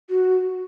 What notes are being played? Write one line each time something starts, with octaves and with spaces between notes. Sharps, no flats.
F#4